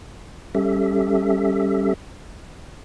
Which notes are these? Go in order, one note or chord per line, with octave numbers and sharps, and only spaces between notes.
G3 C#4 G4 A4 E5